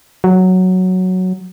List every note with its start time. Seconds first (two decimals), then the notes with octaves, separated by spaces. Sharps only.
0.24 F#3